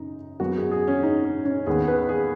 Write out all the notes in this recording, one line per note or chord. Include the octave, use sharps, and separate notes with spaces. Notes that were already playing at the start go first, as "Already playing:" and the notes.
Already playing: F#2 C#3 D#4
F#2 F#3 B3 F#4
G#4
G#4
C#4
D#4
C#4
C#4
D#2 D#3 B3 G#4
B4
G#4